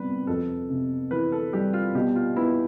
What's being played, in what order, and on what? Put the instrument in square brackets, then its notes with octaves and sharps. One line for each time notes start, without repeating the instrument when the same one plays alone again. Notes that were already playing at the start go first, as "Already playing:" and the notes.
Already playing: [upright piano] C3 G3 B3 [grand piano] B4
[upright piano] F2 [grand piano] A4
[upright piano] C3
[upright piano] E3 [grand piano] B4
[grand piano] A4
[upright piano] G3 [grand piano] G4
[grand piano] F4
[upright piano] B2 [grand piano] G4
[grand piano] F4
[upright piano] B3 [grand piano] E4